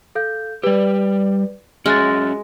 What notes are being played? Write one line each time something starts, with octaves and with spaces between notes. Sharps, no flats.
A4 F5 G6
G3 G4 B4 D5
G#3 C#4 F#4 E5 F6 F#6 A6